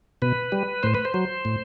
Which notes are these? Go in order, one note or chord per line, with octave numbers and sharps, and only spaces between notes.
B2 B4
G3
A2 C5
B4
C5
F#3
A2